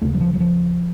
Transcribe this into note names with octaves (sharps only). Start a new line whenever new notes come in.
D#2 C#3 A3
F#3
F3
F#3
F3